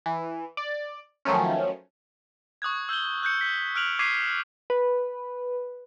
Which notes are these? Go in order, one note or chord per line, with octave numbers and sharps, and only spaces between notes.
E3
D5
D#3 F3 F#3 A3 C#4
C#6 D#6 F#6 G#6
E6 G6 F#7 G7
F#6 G6 C#7
B6
F6 F#6 D7 F7 F#7
C#6 D6 G#6 B6 C7 D#7
B4